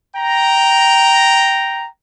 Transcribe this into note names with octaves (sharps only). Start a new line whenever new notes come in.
G5 A#5